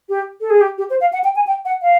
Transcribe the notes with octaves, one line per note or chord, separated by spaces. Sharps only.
G4
A4
G#4
G4
G4
C5
F5
F#5
G5
G#5
G5
F#5
F5